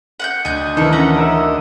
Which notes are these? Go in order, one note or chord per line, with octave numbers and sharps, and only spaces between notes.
F#5 F#6 G6
D2 D#5 G#5 G6
D#3 E3 A4
C#4 F#5 A#5
A#4 E5